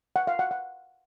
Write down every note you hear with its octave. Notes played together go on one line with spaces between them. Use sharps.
F#5
F5
F#5
F#5